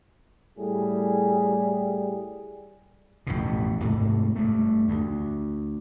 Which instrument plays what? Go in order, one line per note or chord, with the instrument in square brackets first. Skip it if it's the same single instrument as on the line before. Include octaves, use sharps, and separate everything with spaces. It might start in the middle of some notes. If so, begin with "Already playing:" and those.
[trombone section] A2 G3 G#4
[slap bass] A1 F2 B2
G#2 C3 A3 A#3
G2 A3
D2